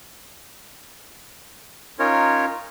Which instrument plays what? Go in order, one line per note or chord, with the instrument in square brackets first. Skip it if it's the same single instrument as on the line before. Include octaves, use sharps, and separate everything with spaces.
[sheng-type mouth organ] C#4 D#4 F4 A#4 C#5